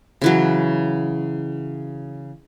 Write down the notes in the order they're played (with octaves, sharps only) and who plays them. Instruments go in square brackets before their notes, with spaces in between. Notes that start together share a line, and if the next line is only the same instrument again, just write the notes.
[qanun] C#3 E3 F#3